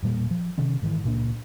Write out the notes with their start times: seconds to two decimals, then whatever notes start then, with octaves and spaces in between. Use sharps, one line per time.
0.02 E1 A#2 G3 A#3
0.31 F3
0.58 C3 D#3 C#4
0.82 G#2 D#3 E3
1.04 C#2 A#2 A#3 D4